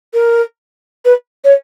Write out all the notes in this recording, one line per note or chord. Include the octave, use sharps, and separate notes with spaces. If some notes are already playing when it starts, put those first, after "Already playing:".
A#4
B4
C#5